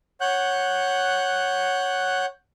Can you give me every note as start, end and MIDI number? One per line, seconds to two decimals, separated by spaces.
0.21 2.26 73
0.21 2.26 78
0.21 2.26 90
0.21 2.26 91